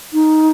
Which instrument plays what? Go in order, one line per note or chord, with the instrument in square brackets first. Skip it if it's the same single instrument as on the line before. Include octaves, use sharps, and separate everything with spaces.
[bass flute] D#4